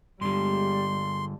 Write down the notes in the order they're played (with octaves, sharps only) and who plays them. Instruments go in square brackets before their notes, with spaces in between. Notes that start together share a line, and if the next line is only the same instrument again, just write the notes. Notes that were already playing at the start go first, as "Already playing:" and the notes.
[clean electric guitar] G2 D3 [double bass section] G3 G#3 [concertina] C6